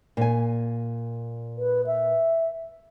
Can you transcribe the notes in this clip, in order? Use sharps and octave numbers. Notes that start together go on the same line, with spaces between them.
A#2 G#5
B4
E5